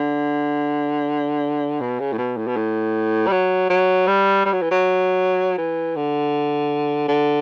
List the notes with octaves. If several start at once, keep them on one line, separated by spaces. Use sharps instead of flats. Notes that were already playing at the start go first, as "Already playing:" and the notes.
Already playing: D3
B2
C#3
A2
B2
A2
B2
A2
G3
F#3
F#3
G3
G3
F#3
E3
F#3
E3
D3
D3